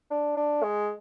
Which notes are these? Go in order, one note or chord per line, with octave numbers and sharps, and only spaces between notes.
D4
D4
G#3